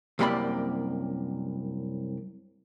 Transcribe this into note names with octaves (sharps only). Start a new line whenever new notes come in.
C2 F#2 A#3 G4 D5 B5